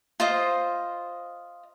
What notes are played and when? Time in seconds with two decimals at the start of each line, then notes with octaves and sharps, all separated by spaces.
0.20 F4 C5 D#5